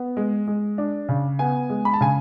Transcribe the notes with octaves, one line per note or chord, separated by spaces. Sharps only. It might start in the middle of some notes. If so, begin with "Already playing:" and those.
Already playing: B3
G#3
G#3
D4
C#3
B3 G#5
G#3
B5
A5
C#3 G#5